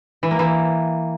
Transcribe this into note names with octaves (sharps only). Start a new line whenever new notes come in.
E3
A#3
E3